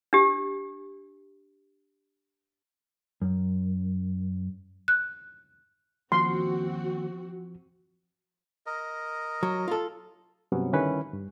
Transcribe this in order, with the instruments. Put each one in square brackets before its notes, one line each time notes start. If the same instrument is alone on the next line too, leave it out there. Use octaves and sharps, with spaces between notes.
[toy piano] D4 G4
[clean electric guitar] F#2
[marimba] F#6
[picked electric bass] D#3 A#3 C#4 [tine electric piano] F3 [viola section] C4 F#4 [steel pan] C6
[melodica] A#4 D#5
[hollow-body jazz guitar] F#3
F4 A4
[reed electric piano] G2 C3 F#3 B3 C#4
D3 D#3 G3 C#4 E4 B4
G2